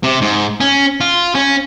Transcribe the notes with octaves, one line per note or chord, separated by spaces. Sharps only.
C3
G#2
C#4
F4
C#4